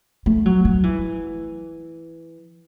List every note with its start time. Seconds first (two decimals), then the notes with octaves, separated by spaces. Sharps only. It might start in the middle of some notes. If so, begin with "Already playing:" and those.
0.26 A3
0.46 F#3
0.65 F#3
0.83 E3